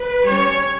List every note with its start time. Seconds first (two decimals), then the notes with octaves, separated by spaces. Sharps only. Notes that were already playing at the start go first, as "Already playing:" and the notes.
Already playing: B4
0.26 G3 C#4 C#5